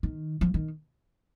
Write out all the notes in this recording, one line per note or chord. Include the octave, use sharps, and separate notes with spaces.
D#3
F3
D#3